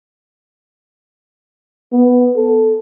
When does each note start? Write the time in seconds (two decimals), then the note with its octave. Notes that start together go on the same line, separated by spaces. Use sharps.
1.92 B3
2.36 A4